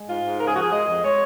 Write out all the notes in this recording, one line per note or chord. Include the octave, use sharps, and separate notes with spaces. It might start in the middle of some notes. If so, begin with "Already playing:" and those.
Already playing: G#3
G#2 F4
G#2
C#3 A#4
G#4
F3 F#4
G#4
G#3 D#5
F2
G#3 C#5